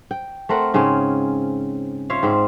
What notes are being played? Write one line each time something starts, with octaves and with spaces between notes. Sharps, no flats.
G5
A3 C4 A#4 F#5
G#2 C#3 C4 C#4
F4 C#5 E5 F5
G#2 C4